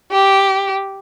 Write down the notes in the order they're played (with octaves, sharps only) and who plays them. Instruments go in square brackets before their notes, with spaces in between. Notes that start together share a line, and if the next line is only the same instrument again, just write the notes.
[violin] G4